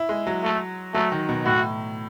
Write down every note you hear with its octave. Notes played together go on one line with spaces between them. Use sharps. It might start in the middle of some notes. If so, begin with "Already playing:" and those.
Already playing: E4
G#3
F#3
A3
F#3 A3
D#3
B2
A2 F#4